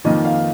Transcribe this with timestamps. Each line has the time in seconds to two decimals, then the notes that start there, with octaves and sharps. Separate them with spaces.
0.04 F2 D#3 A#3 D#5
0.25 F5